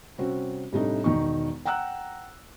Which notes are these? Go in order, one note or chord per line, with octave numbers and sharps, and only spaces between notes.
C3 G3 C4 C#4 F#4
A2 C3 G3 A3 D4 D#4
E1 D#3 D#4 C#6
F#5 G5 A#5 E6 F#6